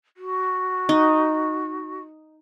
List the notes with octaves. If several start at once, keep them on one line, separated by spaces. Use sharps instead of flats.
F#4
D#4